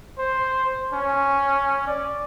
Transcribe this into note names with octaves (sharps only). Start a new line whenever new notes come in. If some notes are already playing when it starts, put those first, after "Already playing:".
C5
C#4
D5